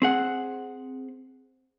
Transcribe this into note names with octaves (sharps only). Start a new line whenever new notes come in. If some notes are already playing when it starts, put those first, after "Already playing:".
C4 G#4 F#5